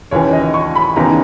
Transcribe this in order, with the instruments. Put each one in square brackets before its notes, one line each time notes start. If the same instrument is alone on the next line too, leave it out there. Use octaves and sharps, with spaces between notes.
[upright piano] D#2 C#3 E3 C#5
D#5
C#6
B5
D#2 C#3 E3 B3 D#4 A#5